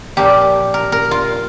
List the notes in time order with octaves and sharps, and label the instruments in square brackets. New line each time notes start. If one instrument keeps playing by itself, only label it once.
[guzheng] A#2 F3 A#3 G4
A#4
A#4
F4